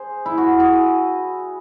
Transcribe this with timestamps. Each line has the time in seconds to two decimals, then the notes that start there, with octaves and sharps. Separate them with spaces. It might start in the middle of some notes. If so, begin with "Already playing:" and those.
Already playing: G#4 C5
0.26 E4
0.38 F#4
0.60 G#4